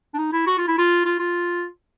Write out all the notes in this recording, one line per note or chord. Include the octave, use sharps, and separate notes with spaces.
D4
D#4
E4
F#4
F4
E4
F4
F4
F4